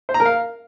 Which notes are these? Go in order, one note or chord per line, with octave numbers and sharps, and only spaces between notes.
C5
A#5
A#4
F5